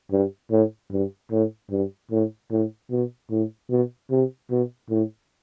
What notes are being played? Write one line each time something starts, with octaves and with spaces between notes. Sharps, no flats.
G2
A2
G2
A2
G2
A2
A2
B2
A2
B2
C3
B2
A2